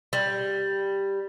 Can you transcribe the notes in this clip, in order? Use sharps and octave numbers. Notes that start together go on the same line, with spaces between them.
G3